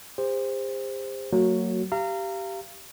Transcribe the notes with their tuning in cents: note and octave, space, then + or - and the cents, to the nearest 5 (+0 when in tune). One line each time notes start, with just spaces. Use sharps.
G4 +45 C5 +0
F#3 +0 A#3 -35 F#4 -10
G4 -10 F5 -30 A#5 -25